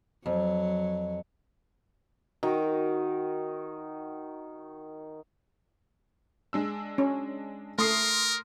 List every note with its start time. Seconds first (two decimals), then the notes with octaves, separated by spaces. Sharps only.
0.26 F2 F#3
2.43 D#3 F#4 A#4
6.53 G#3 D4 E6
6.98 C#4
7.79 A3 A#4 C6 D#6 C7